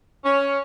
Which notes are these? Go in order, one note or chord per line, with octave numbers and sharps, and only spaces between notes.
C#4